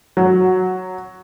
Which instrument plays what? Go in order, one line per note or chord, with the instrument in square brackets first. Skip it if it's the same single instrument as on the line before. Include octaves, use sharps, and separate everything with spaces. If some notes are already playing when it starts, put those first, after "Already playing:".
[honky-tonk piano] F#3